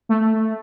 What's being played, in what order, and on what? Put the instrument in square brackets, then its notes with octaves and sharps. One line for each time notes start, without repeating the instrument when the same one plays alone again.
[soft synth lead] A3